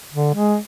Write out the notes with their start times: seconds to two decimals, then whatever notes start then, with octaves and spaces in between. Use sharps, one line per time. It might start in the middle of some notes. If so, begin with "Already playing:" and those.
0.13 D3
0.34 G#3